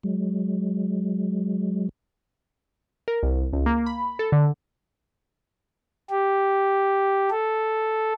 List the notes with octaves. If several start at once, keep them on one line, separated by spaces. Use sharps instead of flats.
F#3 G#3
A#4
C2
C#2
A#3
B5
A4
D3
G4
A4